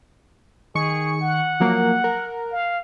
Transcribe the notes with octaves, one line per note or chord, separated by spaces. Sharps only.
D#3 G#4 C#6 C#7
F#5
F3 F#3 A#3
A#4
F5